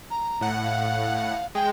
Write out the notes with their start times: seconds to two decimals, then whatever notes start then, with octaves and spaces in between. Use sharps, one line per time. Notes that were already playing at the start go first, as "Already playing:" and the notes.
0.10 A#5
0.41 A2 F#5
0.64 F5
1.55 G#3 G5